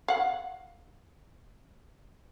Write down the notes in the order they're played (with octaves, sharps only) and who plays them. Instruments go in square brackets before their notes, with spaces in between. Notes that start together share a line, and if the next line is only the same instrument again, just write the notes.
[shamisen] F5 F#5